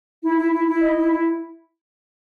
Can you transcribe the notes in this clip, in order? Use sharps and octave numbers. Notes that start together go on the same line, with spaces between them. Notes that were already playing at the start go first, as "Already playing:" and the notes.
E4
E4
E4
E4
D#5
E4
E4